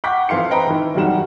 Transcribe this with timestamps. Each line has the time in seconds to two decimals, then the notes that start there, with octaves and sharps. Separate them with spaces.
0.04 F#5 G5 C#6 D6 G6 B6
0.29 F2 E3 F5 C6 C#7
0.50 B4 C5 D#5 G5 A#5 B5
0.67 D#3 E3
0.95 E1 F#2 D#3 G3 F#5 E7